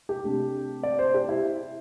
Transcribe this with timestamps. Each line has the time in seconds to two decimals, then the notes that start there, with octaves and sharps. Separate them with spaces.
0.09 G4
0.24 C3 A3 D4
0.83 D5
0.99 C5
1.14 G4
1.29 E4